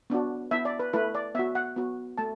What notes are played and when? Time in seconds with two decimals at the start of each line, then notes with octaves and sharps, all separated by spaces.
0.10 B3 D4 F#4
0.51 B3 E4 E5
0.65 D5
0.79 B4
0.93 A3 E4 B4
1.15 D5
1.35 B3 F#4 E5
1.55 F#5
1.76 B3 F#4
2.18 A3 A5